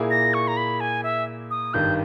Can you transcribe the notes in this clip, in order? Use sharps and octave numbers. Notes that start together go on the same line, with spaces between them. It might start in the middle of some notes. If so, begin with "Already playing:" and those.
Already playing: A#2 A#3 E4 G#4
A#6
C#6
A#5
B5
G#5
E5
D#6
G#1 G2 D#3 G6